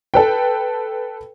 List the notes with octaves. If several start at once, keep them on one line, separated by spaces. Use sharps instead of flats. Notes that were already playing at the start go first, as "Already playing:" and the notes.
A4 B4 G5